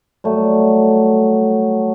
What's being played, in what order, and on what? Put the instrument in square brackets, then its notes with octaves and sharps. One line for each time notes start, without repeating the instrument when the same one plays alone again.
[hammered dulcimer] F#3 G3 A3